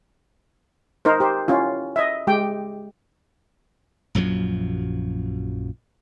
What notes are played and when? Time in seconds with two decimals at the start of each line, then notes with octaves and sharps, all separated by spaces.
1.05 D#4 A#4 C5
1.20 G4 C5
1.48 C#4 E4 F4
1.96 D#5 E5
2.27 G#3 G4 G5
4.15 A#1 F#2 F3 F#3